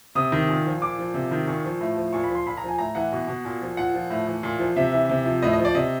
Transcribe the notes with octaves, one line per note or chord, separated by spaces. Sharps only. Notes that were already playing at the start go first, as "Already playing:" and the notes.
C3 D#6
D#3
A#2
F3
A#2 D6
F3
C3
D#3
A#2 C#6
F3
A2
F3
A#2 C#6
B5
F3
C6
A#2 B5
A#5
F3 G#5
A2 A#5
E3 F#5
B2
B2
A#2
F3
A#2 F#5
F3
A2
E3
A#2
F3
C3 E5
E3
C3
F3
A2 D#5
D#5
F3
D5
C3 D#5